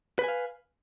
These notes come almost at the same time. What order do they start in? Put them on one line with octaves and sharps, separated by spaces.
B4 G#5 F5